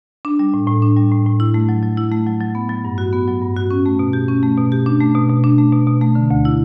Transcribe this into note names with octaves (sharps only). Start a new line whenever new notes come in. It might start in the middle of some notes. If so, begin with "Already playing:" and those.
D4
G3
A2
A2
D4
G3
A2
A2
E4
A3
F#3
F#3
E4
A3
F#3
F#3
B3
F#3
G2
F#4
B3
F#3
G2
F#4
C#4
A3
B2
G4
C#4
A3
B2
G4
D4
A3
B2
B2
D4
A3
B2
B2
A3
D3
D2
E4